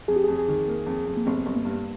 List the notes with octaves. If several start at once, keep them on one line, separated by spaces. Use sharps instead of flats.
F2 G#4
G4
F2 G#4
G#4
D#3
A#3
F2
F2
A#3
G1 C4
G1
A#3
G2